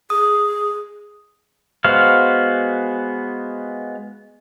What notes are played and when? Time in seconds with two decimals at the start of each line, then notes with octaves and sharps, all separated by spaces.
0.10 G#4 D#6
1.84 G#3 B3 F#4 C5 F5